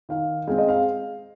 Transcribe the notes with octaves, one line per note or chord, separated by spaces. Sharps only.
D#3 F5
G#3 C4 F5
D#5
F5